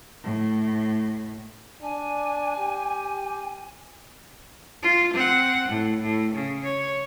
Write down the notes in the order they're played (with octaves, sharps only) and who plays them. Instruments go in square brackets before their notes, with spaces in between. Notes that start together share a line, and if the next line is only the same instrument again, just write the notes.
[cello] A2
[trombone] D4 [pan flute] G#5
[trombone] G4
[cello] F4
C4 F#5
A2
A2
C#3
C#5